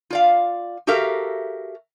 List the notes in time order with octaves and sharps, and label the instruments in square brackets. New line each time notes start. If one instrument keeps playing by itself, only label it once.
[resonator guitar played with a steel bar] F4 D5 F5
F#4 G4 A4 A#4 E5 F5